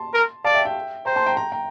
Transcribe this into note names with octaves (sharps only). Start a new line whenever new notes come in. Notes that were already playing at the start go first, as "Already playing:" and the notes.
Already playing: A5 C6
A#4
D5 F5 A5
E5 G5
E5 G5
C5 G5 A#5
A5 C6
G5 A#5
G5 A#5
G5 A#5